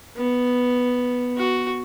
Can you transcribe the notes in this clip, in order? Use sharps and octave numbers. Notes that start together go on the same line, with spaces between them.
B3
F#4